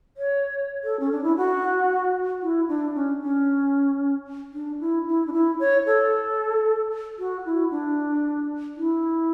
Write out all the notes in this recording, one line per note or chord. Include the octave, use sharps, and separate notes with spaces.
C#5
A4
C#4
D4
E4
F#4
E4
D4
C#4
C#4
D4
E4
E4
D4
E4
C#5
A4
F#4
E4
D4
E4